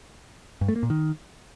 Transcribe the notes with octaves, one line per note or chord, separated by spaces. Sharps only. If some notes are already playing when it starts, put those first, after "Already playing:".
G2
A3
A#3
A#2
D#3